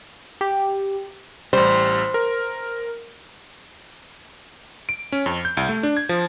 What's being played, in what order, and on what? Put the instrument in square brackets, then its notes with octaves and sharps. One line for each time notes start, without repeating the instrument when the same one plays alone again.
[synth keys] G4
[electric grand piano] A1 G3 [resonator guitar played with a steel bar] C5
[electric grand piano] A#4
D7
C#4
F2
G6
C2
A3
D4
G#6
F3